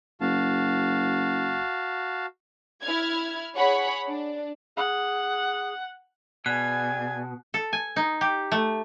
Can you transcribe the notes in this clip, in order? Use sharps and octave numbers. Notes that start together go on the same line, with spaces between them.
F#1 F#4 F5 A5
E4 F6 G#6
G#4 C#5 F#5 B5 C#6
D4
G#4 F#5
B2 G#4 D5 G#5 F#6 G#6
A4
G#5
D#4
G4
A3